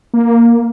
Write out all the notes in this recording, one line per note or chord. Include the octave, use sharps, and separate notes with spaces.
A#3